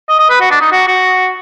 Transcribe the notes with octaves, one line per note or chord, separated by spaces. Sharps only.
D#5
D#5
B4
F#4
D4
D#4
F#4
F#4